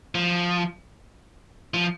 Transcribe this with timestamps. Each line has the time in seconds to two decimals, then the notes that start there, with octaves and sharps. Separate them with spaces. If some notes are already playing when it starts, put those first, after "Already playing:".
0.15 F3
1.74 F3